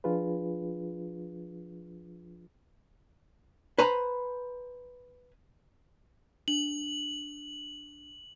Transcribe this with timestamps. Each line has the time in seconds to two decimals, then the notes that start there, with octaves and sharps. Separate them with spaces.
0.04 F3 D4 F4 G#4 B4
3.78 B4 C5 G#5 A#5 B5
6.48 D4 F#7